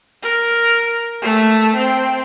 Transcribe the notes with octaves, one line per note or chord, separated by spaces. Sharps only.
A#4
A3
C4